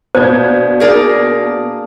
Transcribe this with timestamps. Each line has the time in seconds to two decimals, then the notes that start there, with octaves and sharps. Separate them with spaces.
0.15 B2 A#3 B3 D4 C5 G6 G#6
0.80 D4 G#4 A#4 D5